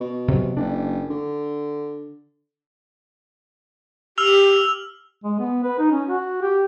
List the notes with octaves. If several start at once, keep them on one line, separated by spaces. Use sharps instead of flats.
B2
C3 F#3
F#1 D4
D3
G4 E6 F6 F7
G#3
B3
B4
D#4
C#4
F#4
G4